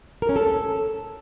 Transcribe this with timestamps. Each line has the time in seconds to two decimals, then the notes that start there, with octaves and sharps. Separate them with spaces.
0.22 A#4
0.29 C#4
0.36 A4